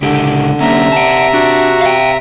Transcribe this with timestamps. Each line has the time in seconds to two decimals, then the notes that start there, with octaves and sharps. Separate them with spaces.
0.02 C#2 D3 G4
0.61 C3 A#3 C#4 E5 A#5
0.92 F#5 A5
1.34 D4 F#4
1.81 F5 G5